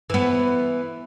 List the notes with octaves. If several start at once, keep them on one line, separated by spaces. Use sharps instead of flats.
E3 B3